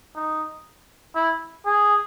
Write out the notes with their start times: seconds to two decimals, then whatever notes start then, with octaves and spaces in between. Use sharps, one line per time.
0.16 D#4
1.15 E4
1.66 G#4